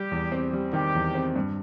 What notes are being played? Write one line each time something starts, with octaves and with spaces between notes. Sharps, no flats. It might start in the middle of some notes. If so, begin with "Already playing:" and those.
Already playing: G3 G4
E2
C4
G3
D#3 G4
E2
C4
G2